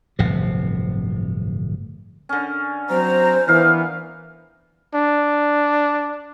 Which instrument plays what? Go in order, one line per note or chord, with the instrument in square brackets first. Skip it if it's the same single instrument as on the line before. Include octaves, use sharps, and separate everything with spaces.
[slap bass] D1 G1 C3 F3
[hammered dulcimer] D3 C#4
[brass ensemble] F#3 C4 A#5 [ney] C5
[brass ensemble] E3 B3 [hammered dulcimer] A#4 F5
[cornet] D4